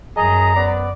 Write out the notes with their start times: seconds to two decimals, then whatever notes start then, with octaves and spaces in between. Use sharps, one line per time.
0.16 F#2 G#4 D#5 A#5
0.56 B3 D5